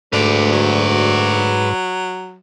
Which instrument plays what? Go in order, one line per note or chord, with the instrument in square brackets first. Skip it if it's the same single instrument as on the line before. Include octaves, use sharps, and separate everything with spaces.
[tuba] D2 [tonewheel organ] G#2 [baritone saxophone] D3 [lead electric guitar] B4 D5
[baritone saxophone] F#3